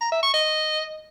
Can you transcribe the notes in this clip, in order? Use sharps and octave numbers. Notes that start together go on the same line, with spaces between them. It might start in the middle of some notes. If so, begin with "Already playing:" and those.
A#5
E5
C#6
D#5